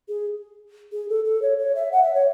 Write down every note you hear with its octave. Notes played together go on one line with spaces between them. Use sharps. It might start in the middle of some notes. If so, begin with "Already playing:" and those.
G#4
G#4
A4
A4
C#5
C#5
E5
F#5
E5
C#5